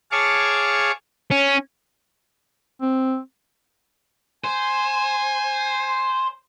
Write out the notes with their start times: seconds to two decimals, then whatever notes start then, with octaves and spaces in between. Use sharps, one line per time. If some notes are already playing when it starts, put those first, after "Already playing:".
0.12 G#4 C#5 F5 A5 C#6 D6
1.31 C#4
2.81 C4
4.44 C5 G#5